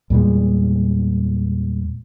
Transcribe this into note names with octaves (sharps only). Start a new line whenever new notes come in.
E2 A#2 G3 G#3